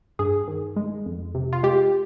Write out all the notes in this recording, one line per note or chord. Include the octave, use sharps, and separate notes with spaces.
G2 G#4
D#3
G#3
F2
C3
F4
G#3 G4